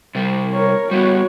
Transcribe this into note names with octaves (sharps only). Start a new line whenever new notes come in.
C3 G3
A#4 C#5
G3 B3 F#4 C#5